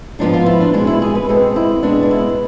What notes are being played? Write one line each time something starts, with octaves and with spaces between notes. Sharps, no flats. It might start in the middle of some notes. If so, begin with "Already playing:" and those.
G#2 F3 B3 D4
F4
E4
D4
B2 G#3 C4 D4
E4
G#4
B4
B2 G#3 C4 A4
E4
B2 G#3 B3 D4
D4
E4